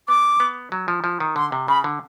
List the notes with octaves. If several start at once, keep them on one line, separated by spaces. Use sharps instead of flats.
B3 D6
B3
F#3
F3
F3
D#3
D3 C6
C3
C#3 B5
D3